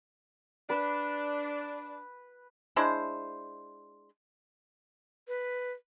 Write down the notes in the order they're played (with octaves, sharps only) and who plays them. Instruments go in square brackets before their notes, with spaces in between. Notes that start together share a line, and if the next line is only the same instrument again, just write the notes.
[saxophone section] D4 [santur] B4
[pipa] G#3 D4 E4 C5
[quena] B4